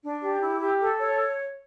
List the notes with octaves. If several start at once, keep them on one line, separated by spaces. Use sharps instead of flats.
D4
G4
E4
G4
A4
C#5